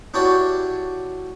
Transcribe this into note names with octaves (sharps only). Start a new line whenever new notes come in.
D4 E4 F#4 G4 C#5 D5